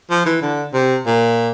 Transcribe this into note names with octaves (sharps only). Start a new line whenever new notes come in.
F3
E3
D3
C3
A#2